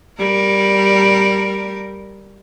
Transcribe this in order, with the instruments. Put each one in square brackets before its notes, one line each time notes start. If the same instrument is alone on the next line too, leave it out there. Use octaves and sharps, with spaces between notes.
[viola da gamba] G3 A#4